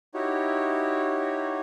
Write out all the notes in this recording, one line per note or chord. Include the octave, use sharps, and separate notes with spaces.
D#4 E4 F#4 G4 C#5